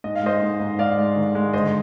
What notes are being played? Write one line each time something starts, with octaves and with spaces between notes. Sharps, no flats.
G#2 D#5
F5
G#3 C5 D#5
G#2
G#2
G#2 D5 F5
G#3
D#3
G#3
G1 C5 D#5